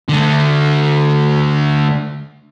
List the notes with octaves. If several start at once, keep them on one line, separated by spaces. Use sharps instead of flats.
D3 A3